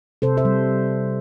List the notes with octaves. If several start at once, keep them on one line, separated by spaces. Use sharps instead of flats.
C3 A4 C5
C5 E5
G3